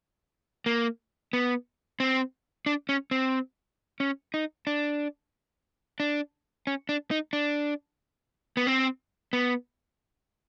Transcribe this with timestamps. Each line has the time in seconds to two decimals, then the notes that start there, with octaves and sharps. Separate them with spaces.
0.66 A#3
1.33 B3
2.00 C4
2.66 D4
2.89 C#4
3.11 C4
4.00 C#4
4.34 D#4
4.67 D4
6.00 D4
6.67 C#4
6.89 D4
7.11 D#4
7.33 D4
8.57 B3
8.67 C4
9.33 B3